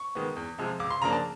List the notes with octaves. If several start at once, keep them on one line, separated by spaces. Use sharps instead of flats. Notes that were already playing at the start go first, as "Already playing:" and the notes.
Already playing: C#6
D#3 G#3 B3
E2
C3 F3 G#3
C#2 D6
C6
C#3 F3 A#3 D4 A#5
A5